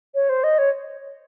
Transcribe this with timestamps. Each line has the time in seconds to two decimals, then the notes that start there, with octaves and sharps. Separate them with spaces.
0.15 C#5
0.29 C5
0.44 D#5
0.58 C#5